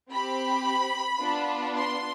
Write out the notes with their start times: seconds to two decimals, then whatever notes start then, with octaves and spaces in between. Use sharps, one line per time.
0.11 C4 G4 B5
1.22 B3 D4 F4
1.77 C6